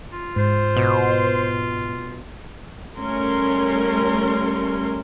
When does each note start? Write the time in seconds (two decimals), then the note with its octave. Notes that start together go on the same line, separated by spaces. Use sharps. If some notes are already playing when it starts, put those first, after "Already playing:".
0.12 F4
0.36 G#2 C5
0.76 B2
2.98 G3 A3 C#4 A#4 C6